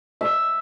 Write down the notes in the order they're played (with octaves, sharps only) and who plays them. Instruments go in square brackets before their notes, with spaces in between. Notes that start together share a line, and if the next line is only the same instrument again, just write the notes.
[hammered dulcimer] E5